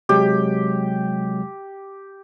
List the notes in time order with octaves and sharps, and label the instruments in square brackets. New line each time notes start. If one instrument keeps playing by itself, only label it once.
[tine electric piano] C3 F#3 G#3 [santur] G4